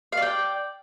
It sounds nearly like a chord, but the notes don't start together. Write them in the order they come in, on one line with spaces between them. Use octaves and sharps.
F5 D5 G5